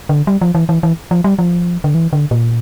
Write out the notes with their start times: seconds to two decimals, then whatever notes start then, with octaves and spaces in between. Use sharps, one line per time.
0.09 D3
0.27 G3
0.41 F3
0.55 E3
0.69 E3
0.83 E3
1.11 F3
1.24 G3
1.39 F3
1.84 D3
1.94 E3
2.13 D3
2.31 A#2